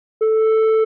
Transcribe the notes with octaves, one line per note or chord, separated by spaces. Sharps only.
A4